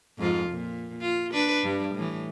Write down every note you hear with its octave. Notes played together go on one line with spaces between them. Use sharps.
F2 G#2 F4
A#2
F4
D4 B4
G2 G3
A2 E3